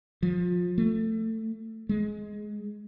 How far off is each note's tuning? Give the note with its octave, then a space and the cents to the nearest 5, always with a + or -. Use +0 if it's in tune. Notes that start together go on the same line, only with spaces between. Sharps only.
F3 +25
A3 +20
G#3 +10